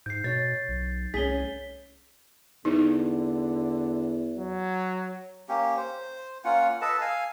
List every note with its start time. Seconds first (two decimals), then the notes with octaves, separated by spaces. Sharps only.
0.06 G#2 G6 C7
0.24 B2 C#5 A6
0.68 B1
1.14 C2 C#4 G#4 B6 G7
2.65 E2 D3 D#4
4.37 F#3
5.49 A#3 C#4 G4
5.77 C5
6.44 A#3 C#4 F4 F#5
6.81 A4 B4 D#5 A5
7.01 F5 G#5